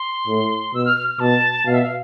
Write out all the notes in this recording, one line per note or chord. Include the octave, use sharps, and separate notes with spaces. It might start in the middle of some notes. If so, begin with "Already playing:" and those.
Already playing: C6
A2
B2 E6
F6
F6
F6
B2 A5
B2 F5
E5
F5